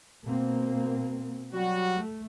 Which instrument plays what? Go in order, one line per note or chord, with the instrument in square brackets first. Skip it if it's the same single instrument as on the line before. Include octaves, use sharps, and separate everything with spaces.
[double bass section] B2 A#3 C4
[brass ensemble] F#3 G3 F#4
[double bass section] A3